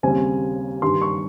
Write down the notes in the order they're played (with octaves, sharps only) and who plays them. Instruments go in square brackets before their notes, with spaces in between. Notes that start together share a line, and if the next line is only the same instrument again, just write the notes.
[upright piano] D#2 C#3 G3 C4 G#5
G2 D#3 G3 C6
C#6